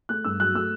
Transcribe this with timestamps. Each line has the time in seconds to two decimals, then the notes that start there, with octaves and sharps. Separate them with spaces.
0.09 A3 F#6
0.24 G2 E6
0.40 F#3 F#6
0.54 A3 E6